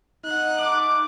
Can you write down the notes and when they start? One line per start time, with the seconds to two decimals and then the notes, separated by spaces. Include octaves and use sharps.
0.24 D#4 F#5 F#6
0.57 A3 D6